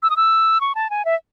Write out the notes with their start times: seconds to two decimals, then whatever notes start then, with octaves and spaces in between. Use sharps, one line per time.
0.03 E6
0.10 D#6
0.17 E6
0.61 C#6
0.75 A5
0.90 G#5
1.05 E5